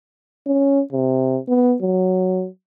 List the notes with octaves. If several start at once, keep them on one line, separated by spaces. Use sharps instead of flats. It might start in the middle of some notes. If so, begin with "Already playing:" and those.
C#4
C3
B3
F#3